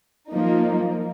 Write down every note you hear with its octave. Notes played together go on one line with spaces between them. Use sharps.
F3 A#3 D#4